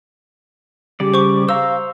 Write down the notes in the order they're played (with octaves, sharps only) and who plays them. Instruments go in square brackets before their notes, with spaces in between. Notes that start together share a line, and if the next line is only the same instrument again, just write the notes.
[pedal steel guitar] C#3 G3 D5 [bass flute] G4
[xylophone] C5 C#6 D6
[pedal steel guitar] C5 A#5 C#6 [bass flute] F5 [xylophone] E6